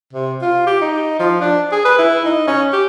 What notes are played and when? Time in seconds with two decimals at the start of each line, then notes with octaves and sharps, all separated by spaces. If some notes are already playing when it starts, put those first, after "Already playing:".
0.13 C3
0.42 F4
0.67 G4
0.82 D#4
1.20 F3
1.41 D4
1.72 G#4
1.85 B4
1.99 E4
2.25 D#4
2.47 C#4
2.73 G4